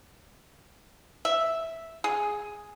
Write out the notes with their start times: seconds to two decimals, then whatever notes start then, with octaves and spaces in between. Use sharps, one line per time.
1.25 E5
2.04 G#4